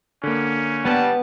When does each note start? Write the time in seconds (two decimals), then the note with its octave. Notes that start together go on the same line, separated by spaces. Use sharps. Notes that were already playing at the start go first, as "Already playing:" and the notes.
0.23 D3 A#3 C#4
0.85 G3 B3 A5